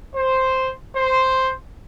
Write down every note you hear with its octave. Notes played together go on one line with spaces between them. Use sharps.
C5
C5